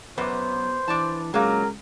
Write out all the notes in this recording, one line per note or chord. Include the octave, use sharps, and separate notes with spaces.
F#2 B2 B3 B4 C5 D6
E3 D4 D5 A5
C#2 F#3 G#3 A#3 A#4